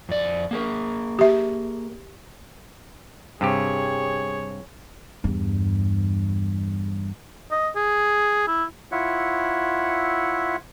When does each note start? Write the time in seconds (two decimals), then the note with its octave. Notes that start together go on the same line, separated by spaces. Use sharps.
0.09 F2 D5
0.51 A#3 G#4 A#4
1.19 G4 E5
3.41 G2 C3 G4 G#4 C#5
5.24 E2 G2
7.52 D#5
7.76 G#4
8.48 E4
8.92 E4 F4 C#5 E5 F#5